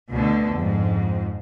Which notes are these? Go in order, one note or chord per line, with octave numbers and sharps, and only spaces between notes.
D2 B2 D3
F2 G#2